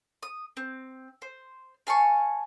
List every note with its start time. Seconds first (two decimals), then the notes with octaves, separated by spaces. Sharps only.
0.23 D#6
0.57 C4
1.22 C5
1.87 F5 G#5 A5 C#6